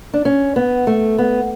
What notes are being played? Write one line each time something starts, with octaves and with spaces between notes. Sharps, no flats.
D4
C#4
B3
A3
B3